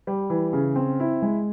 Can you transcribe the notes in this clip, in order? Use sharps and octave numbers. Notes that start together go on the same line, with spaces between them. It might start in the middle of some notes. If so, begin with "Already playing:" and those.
G3
E3
C#3
C4
E4
G#3